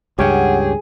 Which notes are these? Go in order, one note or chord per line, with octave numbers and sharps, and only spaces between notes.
C#2 G2 C#4 G4 G#4 C#5 F#5 G5